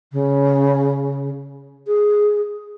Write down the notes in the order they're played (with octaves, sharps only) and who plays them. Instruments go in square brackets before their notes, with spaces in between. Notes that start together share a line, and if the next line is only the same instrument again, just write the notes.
[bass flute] C#3
G#4